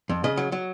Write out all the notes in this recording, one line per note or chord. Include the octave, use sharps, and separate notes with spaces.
F2
C#3 D#5
F#3
F#3